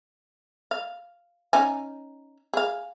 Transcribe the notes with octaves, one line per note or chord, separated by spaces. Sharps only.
F5
C#4 D#4 G#5
G#4 F5